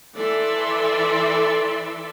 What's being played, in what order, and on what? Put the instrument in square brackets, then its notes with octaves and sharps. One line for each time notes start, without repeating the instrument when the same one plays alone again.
[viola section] E3 A4 D5 E5 C6